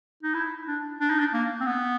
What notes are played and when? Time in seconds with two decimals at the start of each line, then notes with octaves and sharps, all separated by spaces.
0.23 D#4
0.34 E4
0.67 D4
1.01 D4
1.10 D#4
1.19 D4
1.33 A#3
1.61 C4
1.66 B3